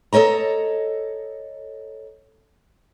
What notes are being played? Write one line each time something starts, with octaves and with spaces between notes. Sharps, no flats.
A4 A#4 C#5 D#5 A#5